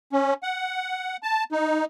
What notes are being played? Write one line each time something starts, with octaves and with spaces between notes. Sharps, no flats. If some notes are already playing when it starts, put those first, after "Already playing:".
C#4
F#5
A5
D#4